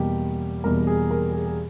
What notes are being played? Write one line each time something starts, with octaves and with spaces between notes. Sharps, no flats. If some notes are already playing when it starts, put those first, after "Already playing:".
Already playing: E2 B2 G3 A#3 G4
E2 B2 G3 A#3 A#4
G#4
A#4
G#4
G#4